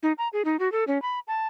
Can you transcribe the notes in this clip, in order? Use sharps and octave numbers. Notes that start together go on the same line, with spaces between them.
D#4
A#5
G#4
D#4
F#4
A4
C#4
B5
A5